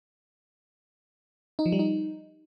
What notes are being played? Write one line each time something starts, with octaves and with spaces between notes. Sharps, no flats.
D#4
F3
G3
D#4